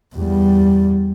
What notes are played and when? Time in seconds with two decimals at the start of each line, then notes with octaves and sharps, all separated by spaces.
0.15 E2 G3